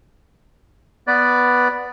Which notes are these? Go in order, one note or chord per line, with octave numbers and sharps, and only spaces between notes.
B3 B4 D5